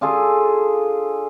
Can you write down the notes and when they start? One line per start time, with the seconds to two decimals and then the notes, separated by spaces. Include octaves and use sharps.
0.01 D4 F4 G#4 A4